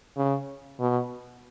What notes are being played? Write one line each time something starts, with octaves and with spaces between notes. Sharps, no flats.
C#3
B2